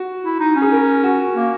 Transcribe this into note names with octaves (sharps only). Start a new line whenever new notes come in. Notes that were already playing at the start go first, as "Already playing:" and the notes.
Already playing: F#4
E4
D#4
C#4
G#4
A#4
F#4
A#3